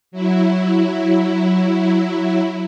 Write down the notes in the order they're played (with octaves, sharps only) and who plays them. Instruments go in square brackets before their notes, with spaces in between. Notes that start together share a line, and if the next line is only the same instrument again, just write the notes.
[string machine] F#3 E4